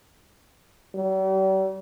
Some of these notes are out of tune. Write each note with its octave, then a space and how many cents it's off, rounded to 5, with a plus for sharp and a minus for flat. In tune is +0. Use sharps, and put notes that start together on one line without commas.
G3 -45